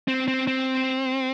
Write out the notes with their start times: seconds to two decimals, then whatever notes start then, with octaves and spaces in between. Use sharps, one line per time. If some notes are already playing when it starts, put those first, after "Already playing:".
0.08 C4
0.28 C4
0.47 C4